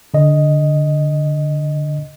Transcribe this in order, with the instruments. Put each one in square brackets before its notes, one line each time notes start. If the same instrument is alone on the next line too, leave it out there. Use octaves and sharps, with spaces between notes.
[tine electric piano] D3 D#5